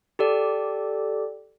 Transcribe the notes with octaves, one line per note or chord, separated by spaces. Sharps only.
G4 A4 D5